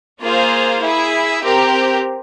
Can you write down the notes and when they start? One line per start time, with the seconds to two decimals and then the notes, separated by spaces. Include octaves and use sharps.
0.20 A#3 F4 G#4 C5 F5
0.80 E4 G#4 E5
1.40 C4 G4 A#4